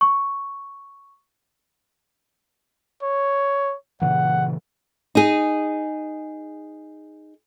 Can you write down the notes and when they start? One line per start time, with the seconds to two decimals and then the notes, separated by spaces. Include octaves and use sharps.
0.01 C#6
3.02 C#5
4.02 A#2 C#3 E3 F#5
5.15 D#4 G#4